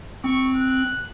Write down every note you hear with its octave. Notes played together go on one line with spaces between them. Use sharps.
C4 C#6
F#6